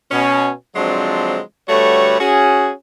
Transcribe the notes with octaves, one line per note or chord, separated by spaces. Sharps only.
B2 C#4
D3 F3 F#3 G#3 C4 D4
D3 G3 A3 F#4 B4 C#5
C#4 F#4 G#4